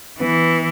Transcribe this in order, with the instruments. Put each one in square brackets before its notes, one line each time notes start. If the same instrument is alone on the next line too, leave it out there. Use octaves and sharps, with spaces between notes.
[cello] E3 [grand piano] B3